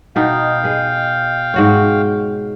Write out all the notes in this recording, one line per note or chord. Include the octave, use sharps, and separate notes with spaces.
B2 D#4 F5 G5
G#4 B4
G#2 F#4 C#5